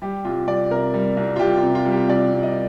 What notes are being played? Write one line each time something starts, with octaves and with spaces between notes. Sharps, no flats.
G3 G4
C2 F4
C2 D5
C3 A#4
G3
C2
F4
C2 G4
F4
C3
F4
G3
G4
C2 D5
C2
D#5